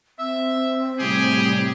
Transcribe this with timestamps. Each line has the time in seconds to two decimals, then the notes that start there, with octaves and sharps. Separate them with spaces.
0.19 C4 E5
0.99 A2 C3 G3 G4 G#4